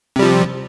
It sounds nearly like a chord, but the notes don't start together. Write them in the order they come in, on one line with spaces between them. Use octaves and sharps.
C3 G3 F3